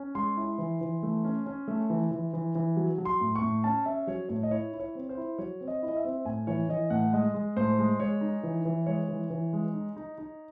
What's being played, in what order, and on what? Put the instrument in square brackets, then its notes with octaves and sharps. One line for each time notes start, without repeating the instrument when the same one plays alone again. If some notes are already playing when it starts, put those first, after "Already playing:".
Already playing: [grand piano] C#4
G#3 C6
E4
E3
E3
A3
C#4
C#4
A3
E3
E3
E3
E3
F#3
F#3
C6
A2
C#6
A2
C#4 A5
C#4 E5
F#3 C#5
A2 C#5
D#5
E4 C#5
E4
C#5
C4
C5
E4
F#3 C#5
C4
D#5
E4
D#5
E5
C4
A2 G#5
E3 C#5
E3 D#5
A2 F#5
G#3 D#5
G#3
A2 C5
G#3
G#3 C#5
D#4
E3
E3
G#3 C#5
E3
E3
G#3
D#4
D#4
D#4